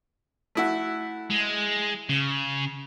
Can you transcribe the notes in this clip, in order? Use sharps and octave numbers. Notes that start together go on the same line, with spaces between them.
A3 E4 F#4
G#3
C#3